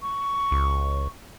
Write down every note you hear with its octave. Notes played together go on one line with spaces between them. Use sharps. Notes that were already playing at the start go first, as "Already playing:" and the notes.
C#6
C#2